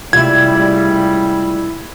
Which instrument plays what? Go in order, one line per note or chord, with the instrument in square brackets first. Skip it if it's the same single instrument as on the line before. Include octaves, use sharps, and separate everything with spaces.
[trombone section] C#2 G3 [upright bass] C3 A3 [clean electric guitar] E4 F4 [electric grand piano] G#6